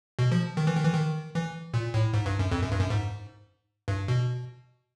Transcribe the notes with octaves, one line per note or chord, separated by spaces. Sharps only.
B2
F3
D#3
E3
D#3
E3
D#3
E3
A#2
A2
G#2
G2
F#2
F2
F#2
G2
F#2
G#2
G2
B2